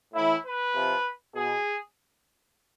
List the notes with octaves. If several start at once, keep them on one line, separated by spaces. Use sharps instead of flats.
A2 E3 E4
B4
C3 F3
B2 G#4